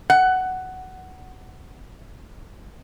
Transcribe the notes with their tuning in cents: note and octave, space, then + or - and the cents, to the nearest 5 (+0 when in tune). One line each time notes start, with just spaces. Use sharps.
F#5 +10